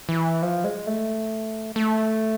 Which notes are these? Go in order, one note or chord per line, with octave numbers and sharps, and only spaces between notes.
E3
F3
G#3
A3
A3